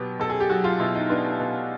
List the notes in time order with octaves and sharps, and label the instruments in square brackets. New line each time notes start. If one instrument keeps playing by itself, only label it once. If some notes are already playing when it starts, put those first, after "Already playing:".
Already playing: [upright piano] B2 F#3 B3 G4
B2 A4
G#4
G4
F#3 F#4
F4
B2 E4
D#4
B3 D4
B2